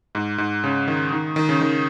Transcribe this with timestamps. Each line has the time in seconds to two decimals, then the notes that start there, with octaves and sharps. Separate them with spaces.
0.15 G#2
0.38 G#2
0.64 C#3
0.88 D#3
1.12 D#3
1.36 D#3
1.49 C#3
1.61 D#3